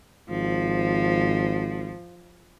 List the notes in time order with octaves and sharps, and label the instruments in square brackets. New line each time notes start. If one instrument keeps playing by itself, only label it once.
[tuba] G#1 [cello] F3